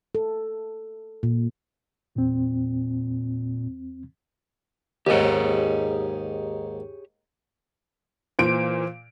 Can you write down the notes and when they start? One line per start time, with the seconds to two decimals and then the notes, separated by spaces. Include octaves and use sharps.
0.15 A4
1.23 A#2
2.15 E2 A#2 C4
5.07 D#2 G#2 G4 G#4 C#5
8.39 A#2 E3 C5 D7